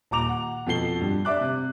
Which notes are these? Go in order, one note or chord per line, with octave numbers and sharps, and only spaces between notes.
D#1 A#5 D6 F7
F#5
F2 B2 A4 C7 G7
G2
D5 E5 D6 F#6
C3